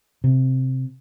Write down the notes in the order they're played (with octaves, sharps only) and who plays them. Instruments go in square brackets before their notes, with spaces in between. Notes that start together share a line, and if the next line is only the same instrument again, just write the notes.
[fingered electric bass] C3